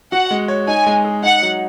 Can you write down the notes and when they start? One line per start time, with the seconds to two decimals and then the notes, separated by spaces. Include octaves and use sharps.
0.12 F#4 F#5
0.31 G#3
0.48 C#5
0.67 D#4 G#5
0.86 G#3
1.05 G#4
1.23 D#4 F#5
1.42 F#3